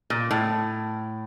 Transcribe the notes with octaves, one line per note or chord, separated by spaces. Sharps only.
A#2
A2